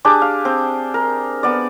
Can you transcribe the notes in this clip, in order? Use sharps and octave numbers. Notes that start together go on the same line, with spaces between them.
D4 G4 G#4 D6
F5
C4
A#4
B3 D5